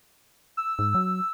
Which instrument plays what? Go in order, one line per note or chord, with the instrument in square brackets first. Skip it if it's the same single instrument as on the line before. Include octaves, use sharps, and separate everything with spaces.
[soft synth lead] E6
[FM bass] G#2
F#3